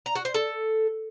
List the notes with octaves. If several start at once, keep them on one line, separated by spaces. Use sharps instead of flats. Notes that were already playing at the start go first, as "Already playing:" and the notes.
A#5
F#4
C5
A4